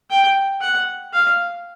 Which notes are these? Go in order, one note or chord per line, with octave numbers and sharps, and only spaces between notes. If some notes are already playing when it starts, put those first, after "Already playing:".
G5
F#5
F5